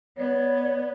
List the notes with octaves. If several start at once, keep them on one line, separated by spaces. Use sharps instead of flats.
B3 B4 C#5 D5